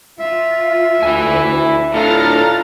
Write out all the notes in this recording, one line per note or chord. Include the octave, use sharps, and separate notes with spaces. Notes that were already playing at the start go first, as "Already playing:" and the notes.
F4 E5
D2 E4 G#5
A2 D3 F4 A4 A#5 F6 A6